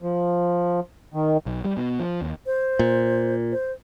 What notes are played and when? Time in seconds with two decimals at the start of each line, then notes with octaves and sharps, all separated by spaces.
0.02 F3
1.14 D#3
1.46 B1
1.65 G3
1.77 B2
2.00 F3
2.22 D#2
2.46 C5
2.79 A#2
3.52 C5